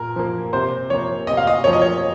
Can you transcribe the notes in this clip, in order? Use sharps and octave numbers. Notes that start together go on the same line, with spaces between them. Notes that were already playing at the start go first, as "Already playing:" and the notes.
Already playing: A#2 A#4
F3 A#3
C3 C5
F3 A#3 C#5
C3 D#5
F5
D#5
F3 A#3 C#5
D#5
C#5